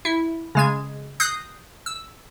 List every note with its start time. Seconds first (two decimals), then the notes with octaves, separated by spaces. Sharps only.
0.05 E4
0.55 C#3 G#3 G#6
1.20 D#6 F#6 G6 A#6 C7
1.86 E6